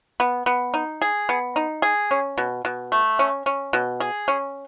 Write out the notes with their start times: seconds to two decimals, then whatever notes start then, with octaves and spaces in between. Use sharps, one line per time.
0.20 B3
0.46 B3
0.74 D#4
1.02 G#4
1.29 B3
1.56 D#4
1.82 G#4
2.11 C#4
2.38 B2
2.65 B2
2.92 A3
3.19 C#4
3.46 C#4
3.73 B2
4.00 G#4
4.28 C#4